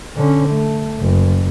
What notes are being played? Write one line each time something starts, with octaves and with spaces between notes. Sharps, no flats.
D3 C#4
A3
F#1